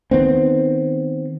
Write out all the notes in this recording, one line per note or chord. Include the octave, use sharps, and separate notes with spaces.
D#3 B3 C4